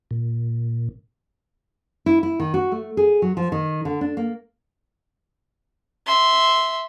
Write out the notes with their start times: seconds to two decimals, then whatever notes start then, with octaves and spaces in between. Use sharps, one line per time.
0.11 A#2
2.06 E4
2.23 E4
2.40 D#3
2.54 F#4
2.72 A3
2.97 G#4
3.22 F#3
3.37 F3
3.52 D#3
3.85 D3
4.01 D4
4.17 A#3
6.06 E5 C6